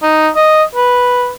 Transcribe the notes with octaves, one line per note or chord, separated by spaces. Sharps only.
D#4
D#5
B4